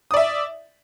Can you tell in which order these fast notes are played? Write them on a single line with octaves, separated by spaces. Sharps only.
D#6 D5 E5